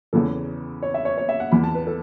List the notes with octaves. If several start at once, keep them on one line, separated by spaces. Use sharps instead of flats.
E2 C#3 E3 A4
C#5
E5
C#5
C#5
E5
F#5
E2 E3 B5
A5
B4
A4